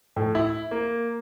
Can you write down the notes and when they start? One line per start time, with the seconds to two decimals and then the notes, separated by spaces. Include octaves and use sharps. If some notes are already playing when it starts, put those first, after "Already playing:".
0.16 A2
0.35 E4
0.71 A#3